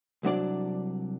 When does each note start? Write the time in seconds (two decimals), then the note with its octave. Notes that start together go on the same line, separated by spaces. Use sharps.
0.23 C2 F#3 D4 D5